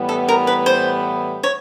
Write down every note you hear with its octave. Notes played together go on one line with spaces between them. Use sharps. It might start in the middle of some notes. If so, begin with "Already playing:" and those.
Already playing: A2 E3 G3 B3
A4
A#4
B4
C5
C#5